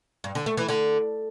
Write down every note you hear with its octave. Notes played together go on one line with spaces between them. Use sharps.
G2
D3
A3
E3
D3